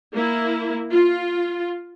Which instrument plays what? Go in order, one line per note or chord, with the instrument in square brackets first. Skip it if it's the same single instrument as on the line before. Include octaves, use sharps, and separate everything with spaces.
[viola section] A#3 E4
F4